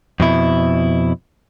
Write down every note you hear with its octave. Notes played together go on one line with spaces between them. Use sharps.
F2 B2 E4